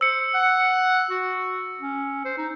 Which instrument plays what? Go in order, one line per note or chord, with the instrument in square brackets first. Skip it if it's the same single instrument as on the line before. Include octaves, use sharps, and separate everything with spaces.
[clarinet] C5 [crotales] E6 C#7
[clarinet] F#5
F#4
C#4
C5
D#4